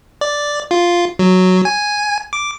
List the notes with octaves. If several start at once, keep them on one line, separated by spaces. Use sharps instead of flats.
D5
F4
F#3
G#5
D6